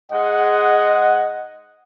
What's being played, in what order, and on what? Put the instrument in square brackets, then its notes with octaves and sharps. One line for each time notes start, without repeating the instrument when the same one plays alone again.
[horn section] G#2 G#3 F#5 [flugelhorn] D#5